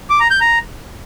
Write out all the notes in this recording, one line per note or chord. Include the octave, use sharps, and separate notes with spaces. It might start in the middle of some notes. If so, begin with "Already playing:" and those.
D6
A#5
G6
A#5